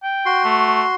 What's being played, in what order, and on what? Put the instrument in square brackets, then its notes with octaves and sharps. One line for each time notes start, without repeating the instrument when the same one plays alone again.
[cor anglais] G5
[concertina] F#4 C6
[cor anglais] A3